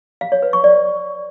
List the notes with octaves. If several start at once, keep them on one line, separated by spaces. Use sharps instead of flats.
F5
C#5
B4
C#6
D5